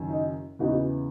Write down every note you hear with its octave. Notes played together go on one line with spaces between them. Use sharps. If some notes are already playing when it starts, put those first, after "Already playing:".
Already playing: F#1 F#2 D#3
D#4
E2 C#3 E3 D#4 F#4